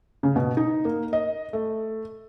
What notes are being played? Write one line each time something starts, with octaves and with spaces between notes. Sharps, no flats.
C#3
B2
D#4
A#3
D#5
A3